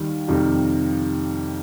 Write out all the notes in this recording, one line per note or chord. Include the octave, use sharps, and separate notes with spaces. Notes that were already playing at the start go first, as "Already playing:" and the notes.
Already playing: D#2 D#3 G3
F2 C3 D#3 G3